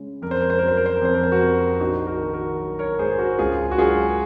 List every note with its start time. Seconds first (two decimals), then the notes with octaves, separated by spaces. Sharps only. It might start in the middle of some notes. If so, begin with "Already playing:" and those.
Already playing: C#3 G#3
0.22 F2 A#4
0.31 C5
0.41 A#4
0.50 C5
0.59 F#3 A#4
0.68 C5
0.77 A#4
0.86 C5
0.96 A#4
1.01 F2 C5
1.14 A#4
1.23 C5
1.32 F#4 A#4
1.41 C3
1.80 A#1 D#4 F#4
2.07 F#4 A#4
2.21 D#3
2.34 F#4 A#4
2.59 F#3
2.79 A#4 C#5
2.99 G#2 G#4 C5
3.18 F#4 A#4
3.39 C#2 F4 G#4
3.71 F#4
3.78 F#3 F4 G#4